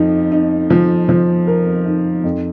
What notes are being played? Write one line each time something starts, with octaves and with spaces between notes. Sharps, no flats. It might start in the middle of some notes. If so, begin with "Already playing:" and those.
Already playing: F2 F3 D#4
D#4
F3
F3
A#4
D#4
F2